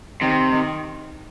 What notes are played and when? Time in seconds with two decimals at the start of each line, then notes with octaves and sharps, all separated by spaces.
0.21 C3 D#3
0.52 D#3